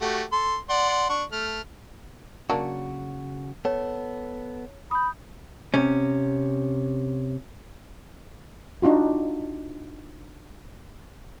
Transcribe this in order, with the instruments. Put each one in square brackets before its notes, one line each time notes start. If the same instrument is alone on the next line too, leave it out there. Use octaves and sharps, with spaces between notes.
[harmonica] A3 F#4 G4
A4 C6
D5 F#5 C6
D4 C#6
A3 F6
[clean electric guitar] C#3 F#4 [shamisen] F#3 A#3 D4
[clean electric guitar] B3 A4 [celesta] C#5
[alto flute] B5 [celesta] D#6 G6
[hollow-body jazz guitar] C3 C#4
[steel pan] D4 D#4 F4 F#4